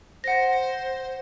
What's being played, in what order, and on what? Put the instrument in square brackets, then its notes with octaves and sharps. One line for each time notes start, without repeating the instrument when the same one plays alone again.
[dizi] C5 [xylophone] F#5 A#6